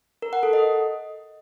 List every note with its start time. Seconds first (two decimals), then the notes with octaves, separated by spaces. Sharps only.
0.22 A#4
0.33 F#5
0.43 A4
0.53 D#5